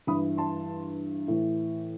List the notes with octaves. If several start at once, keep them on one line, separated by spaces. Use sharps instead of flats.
G2 E3 B5 D#6
A5 C6
A2 E3